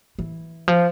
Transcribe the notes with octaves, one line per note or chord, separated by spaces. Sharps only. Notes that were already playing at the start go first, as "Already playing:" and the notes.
E3
F3